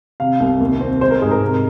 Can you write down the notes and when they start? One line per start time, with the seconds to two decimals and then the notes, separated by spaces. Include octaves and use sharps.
0.20 C3 F5
0.40 C2
0.60 D#2
0.81 C4
1.01 G#3 C5
1.11 A#4
1.22 G#2 G#4
1.31 A#4
1.41 C3